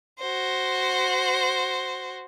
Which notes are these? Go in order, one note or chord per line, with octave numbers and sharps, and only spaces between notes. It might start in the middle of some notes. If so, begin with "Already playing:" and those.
F#4 C5